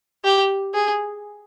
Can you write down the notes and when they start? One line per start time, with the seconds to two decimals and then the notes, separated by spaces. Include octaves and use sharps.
0.25 G4
0.74 G#4